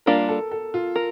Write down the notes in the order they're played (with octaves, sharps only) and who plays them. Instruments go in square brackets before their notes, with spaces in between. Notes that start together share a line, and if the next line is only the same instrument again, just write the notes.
[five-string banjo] G3 A#3 D4 F4 [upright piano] A#4
[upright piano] A4
A4
F4
[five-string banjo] A#4